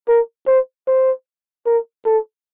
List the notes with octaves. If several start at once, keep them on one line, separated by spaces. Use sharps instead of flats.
A#4
C5
C5
A#4
A4